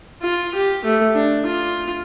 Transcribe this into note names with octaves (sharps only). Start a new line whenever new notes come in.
F4
G4
A3
D4
F4